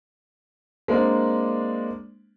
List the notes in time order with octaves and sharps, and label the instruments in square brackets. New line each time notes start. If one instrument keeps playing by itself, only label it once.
[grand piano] G#3 A#3 C4 D4